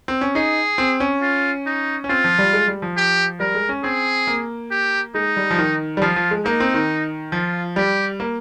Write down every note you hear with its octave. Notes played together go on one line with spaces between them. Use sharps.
C4
C#4
D#4 G#4
C4
C#4
F4
D#4
C#4
C4 F4
F3
G3
G#3
G3
F3
G4
G3 A#4
G#3
C#4
C4 G#4
A#3
G4
G#3 D#4
G3
F3
D#3
G3
F3 F4
F3
G#3
A#3 D#4
C4
D#3
F3 F4
G3 G4
A#3